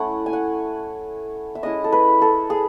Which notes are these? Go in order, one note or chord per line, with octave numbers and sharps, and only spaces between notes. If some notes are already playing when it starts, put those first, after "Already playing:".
Already playing: A3 C#4 E4 F#5
G#5
F#5
E5
G#3 C#4 E4 D#5
A4
B4
A4
G#4